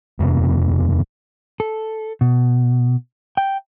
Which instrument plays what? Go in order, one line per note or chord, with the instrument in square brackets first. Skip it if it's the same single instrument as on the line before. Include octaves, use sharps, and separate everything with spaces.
[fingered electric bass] D#1 F2 C3 B3
[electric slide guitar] A4
B2
G5